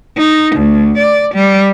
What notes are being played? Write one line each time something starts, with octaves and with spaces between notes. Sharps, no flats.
D#4
D2
D5
G3